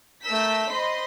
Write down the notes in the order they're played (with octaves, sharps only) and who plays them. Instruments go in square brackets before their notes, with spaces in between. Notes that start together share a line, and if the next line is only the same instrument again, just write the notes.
[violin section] A3 A#4 E6 G6 B6
C5 D#5 B5 C6